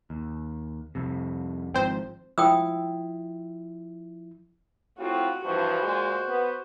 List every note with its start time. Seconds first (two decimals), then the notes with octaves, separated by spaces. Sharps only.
0.10 D#2
0.95 C2 F2 C3
1.74 G#1 G#2 F3 C4 C5
2.38 F3 E4 G5 D#6 E6
4.99 A2 C4 F4 F#4
5.45 G2 E3 F3 F#4 C5
5.82 A#2 G#3
6.28 B3